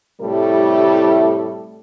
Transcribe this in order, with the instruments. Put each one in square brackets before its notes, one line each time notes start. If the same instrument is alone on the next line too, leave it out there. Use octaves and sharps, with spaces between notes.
[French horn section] A2 C3 G3 A3 E4 A4